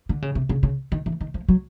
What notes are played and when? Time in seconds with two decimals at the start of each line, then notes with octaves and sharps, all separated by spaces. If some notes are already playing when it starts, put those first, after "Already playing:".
0.09 D3
0.22 C#3
0.35 C3
0.49 C#3
0.63 C#3
0.92 D#3
1.06 E3
1.21 D#3
1.34 F3
1.48 F#3